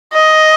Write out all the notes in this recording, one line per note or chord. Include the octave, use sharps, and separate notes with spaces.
D#5